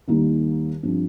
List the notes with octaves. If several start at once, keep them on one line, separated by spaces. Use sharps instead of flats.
D#2 D#3 G3 A#3 D#4
G2 F3 C4